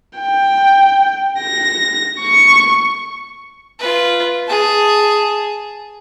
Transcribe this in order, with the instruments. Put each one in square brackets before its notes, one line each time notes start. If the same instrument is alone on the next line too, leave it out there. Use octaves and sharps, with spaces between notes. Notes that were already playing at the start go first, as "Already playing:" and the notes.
[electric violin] G5
A#6
C#6
[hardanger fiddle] F4 B4
G#4 A5